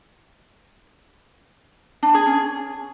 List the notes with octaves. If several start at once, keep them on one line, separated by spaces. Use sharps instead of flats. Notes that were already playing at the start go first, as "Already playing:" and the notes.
D4
G#4
C#4